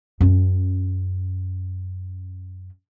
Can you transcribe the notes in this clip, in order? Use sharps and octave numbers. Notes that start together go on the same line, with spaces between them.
F#2 C#4